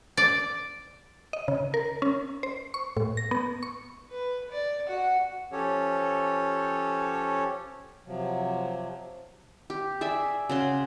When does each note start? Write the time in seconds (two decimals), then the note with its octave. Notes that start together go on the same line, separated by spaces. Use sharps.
0.17 D5
1.33 D#5
1.48 C#3
1.74 A#4
2.02 C#4
2.43 C5
2.74 C#6
2.97 A2
3.17 A#6
3.31 B3
3.63 C#6
4.11 B4
4.51 D5
4.88 F#4 F#5
5.52 F3 C#4 G4 A4 C#5
8.07 C3 F3 F#3
9.70 G4
10.01 G#4 D5 E5
10.49 C#3 F#4 C6